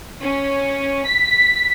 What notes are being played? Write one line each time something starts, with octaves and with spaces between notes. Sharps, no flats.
C#4
B6